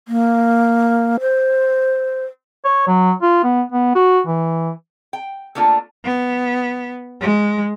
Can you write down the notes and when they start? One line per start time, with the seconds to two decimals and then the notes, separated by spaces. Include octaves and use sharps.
0.08 A#3
1.21 C5
2.65 C#5
2.87 F#3
3.22 F4
3.44 B3
3.72 B3
3.95 F#4
4.27 E3
5.13 G5
5.55 A3 A#3 D4 F4 A4
6.04 B3
7.19 G#3